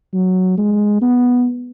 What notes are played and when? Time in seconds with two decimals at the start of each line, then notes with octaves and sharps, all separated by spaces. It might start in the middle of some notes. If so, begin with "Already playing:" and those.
0.13 F#3
0.58 G#3
1.02 B3